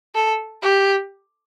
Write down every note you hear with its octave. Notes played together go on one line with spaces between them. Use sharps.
A4
G4